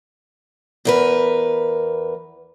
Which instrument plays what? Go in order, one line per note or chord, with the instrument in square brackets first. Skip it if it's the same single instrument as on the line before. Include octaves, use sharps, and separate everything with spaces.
[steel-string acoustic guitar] E2 A#4 B4